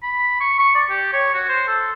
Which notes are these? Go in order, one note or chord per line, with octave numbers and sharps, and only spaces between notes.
B5
C#6
C#6
D5
G4
C#5
F#4
C5
A4